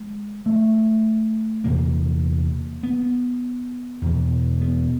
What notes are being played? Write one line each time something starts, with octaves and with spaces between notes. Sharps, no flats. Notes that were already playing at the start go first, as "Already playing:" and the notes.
Already playing: G#3
A3
E2 C3 A#3
B3
E2 B2
B3